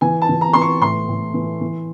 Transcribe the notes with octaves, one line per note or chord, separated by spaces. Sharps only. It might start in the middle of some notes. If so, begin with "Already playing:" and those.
E3 G#5
A5
E3
A#5
E3 C6
C#6
A2 C6
A2
E3
E3